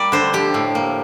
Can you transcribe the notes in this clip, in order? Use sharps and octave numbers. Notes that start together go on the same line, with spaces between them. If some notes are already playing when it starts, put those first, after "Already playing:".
Already playing: G3 A#3 D5
D3 C5
F3 G4
A2
A#3